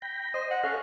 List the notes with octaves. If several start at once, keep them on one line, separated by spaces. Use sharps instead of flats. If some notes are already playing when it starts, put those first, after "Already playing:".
G5 B5 A#6
C5 D#5
F#5
C#4 A4 F5 C6 F#6